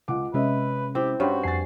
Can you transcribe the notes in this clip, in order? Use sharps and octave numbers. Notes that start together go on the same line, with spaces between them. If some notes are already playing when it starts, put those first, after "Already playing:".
C#2 F#5 D6
C3 G#3 C#4 B4 D#5 E5
C4 E4 G4
G2 C#4 F#4 C#5 G5 B5 C6
F2 G#5 A6 C7